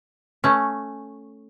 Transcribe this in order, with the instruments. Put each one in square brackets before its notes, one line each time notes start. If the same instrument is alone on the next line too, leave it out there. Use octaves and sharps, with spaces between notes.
[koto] A3 C#4